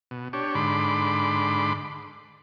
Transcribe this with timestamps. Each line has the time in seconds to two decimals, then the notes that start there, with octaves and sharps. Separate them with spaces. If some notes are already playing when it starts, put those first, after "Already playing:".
0.11 B2
0.33 D4 G4 C#5
0.55 G#2 D3 B5 C6 D6